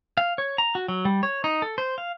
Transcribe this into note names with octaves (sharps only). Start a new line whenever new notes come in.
F5
C#5
A#5
F#4
F#3
G3
C#5
D#4
A4
C5
F5